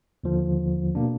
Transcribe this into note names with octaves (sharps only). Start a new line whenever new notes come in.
D#2 D3 F3
B2 A#3 D4